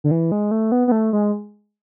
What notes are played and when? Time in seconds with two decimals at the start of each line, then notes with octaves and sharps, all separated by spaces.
0.04 D3
0.11 E3
0.32 G#3
0.51 A3
0.72 B3
0.88 B3
0.92 A3
1.13 G#3